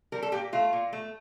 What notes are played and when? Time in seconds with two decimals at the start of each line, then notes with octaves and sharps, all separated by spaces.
0.12 G3 A#4
0.23 A4
0.32 A#2 G4
0.53 A3 F4
0.73 A#2
0.93 A3